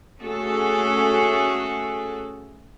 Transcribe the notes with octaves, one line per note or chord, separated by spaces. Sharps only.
A3 C#4 F#4 G#4 A4